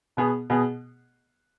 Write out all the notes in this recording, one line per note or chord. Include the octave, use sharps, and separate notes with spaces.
B2 B3 G#4
B2 B3 G#4